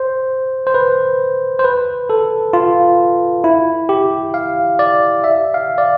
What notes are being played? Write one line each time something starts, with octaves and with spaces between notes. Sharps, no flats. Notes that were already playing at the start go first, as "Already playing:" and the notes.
Already playing: C5
C5
B4
C5
B4
A4
F4
E4
G4
F5
D5
E5
F5
D5